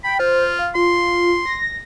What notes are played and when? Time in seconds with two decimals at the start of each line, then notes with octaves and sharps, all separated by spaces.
0.04 G5 B5
0.20 F4 C5
0.59 F5
0.75 F4 C6
1.46 A#6